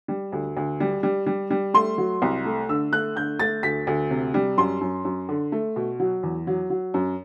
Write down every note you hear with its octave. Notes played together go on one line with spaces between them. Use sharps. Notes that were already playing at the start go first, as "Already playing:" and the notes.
G3
D2
D2
G3
G3
G3
G3
A3 C6
F#3
C2
A3
D3 E6
A3 F#6
D3 G6
A3 A6
D2 B6
D2
C3
G3
F#2 C6
F#2
F#2
D3
A3
B2
F#3
E2
F#3
F#3
F#2